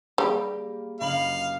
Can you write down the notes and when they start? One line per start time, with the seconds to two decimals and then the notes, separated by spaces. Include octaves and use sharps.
0.18 G3 A#3 G4 G#4 F5 B5
1.00 F#1 D#5 F5 B5 F#7